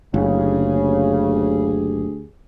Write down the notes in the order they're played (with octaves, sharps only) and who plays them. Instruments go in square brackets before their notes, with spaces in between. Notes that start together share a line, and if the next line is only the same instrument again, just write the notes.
[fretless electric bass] F#1 [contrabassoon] D2 [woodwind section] C#3 [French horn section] G4 G#4